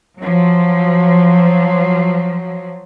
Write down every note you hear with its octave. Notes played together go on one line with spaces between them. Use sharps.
F3 F#3